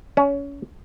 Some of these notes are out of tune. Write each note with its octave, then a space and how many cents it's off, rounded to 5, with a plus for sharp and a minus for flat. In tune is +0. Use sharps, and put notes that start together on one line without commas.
C#4 +25